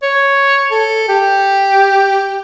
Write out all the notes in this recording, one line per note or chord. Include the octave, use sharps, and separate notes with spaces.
C#5
A4
G4